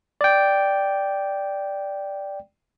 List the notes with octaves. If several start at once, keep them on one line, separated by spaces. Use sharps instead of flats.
D5 G5